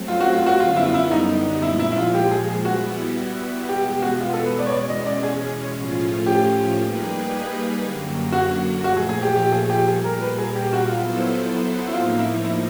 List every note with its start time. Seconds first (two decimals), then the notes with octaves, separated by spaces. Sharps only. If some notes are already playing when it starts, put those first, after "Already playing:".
Already playing: F#3 A3 C4
0.08 F4
0.20 F#4
0.33 F4
0.46 F#4
0.59 F#2 D3 G3 B3 F4
0.70 F4
0.76 E4
0.86 F4
0.94 E4
1.11 D#4
1.62 A#2 F3 G#3 E4
1.79 E4
1.92 E4
1.97 F4
2.14 G4
2.31 G#4
2.48 G#4
2.65 G3 B3 E4 F#4
3.68 E2 B2 G#3 B3 G4
3.86 G4
4.02 F#4
4.20 F4
4.33 A4
4.46 B4
4.59 D5
4.66 C#5
4.71 E2 B2 G#3 C#4 D5
4.89 D#5
5.06 D5
5.23 G#4
5.75 A2 F3 A3 C#4 F4
6.26 G4
6.78 G3 A#3 D#4 G#4 B4
7.81 F#2 D3 F#3 A#3
8.32 F#4
8.84 A#2 F3 A3 F#4
8.96 G#4
9.09 G#4
9.22 G4
9.36 G4
9.52 G#4
9.70 G4
9.87 A#2 G3 A#3 G#4
10.04 A#4
10.21 B4
10.38 G#4
10.55 G4
10.67 G4
10.73 F#4
10.89 F#3 B3 E4 F4 A4 C5
11.88 E4
11.93 A2 F3 A#3 D#4 F4
12.19 E4
12.45 E4